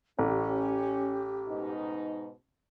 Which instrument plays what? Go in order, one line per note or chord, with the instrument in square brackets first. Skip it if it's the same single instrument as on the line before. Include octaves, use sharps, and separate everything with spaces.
[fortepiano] A1 [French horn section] C#4 [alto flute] G4
[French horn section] G#2 B2 D#4